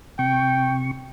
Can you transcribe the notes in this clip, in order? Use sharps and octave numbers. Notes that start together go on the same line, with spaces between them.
C3 G5 C#6